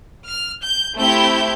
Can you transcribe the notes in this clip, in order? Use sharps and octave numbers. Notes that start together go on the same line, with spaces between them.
F6
G6
A3 C4 E4 G4 G6